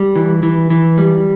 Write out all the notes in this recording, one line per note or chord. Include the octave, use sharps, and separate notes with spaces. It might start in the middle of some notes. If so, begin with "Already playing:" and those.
Already playing: G3
E3
E3
E3
G3